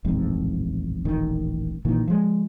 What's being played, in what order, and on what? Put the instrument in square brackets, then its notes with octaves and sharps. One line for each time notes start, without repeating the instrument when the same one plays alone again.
[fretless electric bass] D#1 A1 F2 G#2
D#1 A1 D#3
A#1 A#2 D#3 E3
F3 G#3